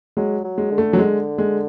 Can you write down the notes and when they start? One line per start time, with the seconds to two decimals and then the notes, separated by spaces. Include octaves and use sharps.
0.17 F#3 G#3
0.44 F#3
0.58 G#3
0.71 D3
0.78 A3
0.93 F#3
0.98 D3 G#3
1.38 G#3